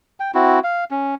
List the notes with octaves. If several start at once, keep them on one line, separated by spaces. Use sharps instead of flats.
G5
C4 E4 F#4
F5
C#4